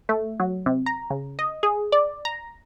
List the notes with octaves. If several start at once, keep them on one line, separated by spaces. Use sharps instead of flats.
A3
F#3
C3
A#5
C#3
D#5
G#4
D5
A#5